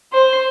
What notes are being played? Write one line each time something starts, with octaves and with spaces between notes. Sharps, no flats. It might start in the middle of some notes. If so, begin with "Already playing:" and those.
C5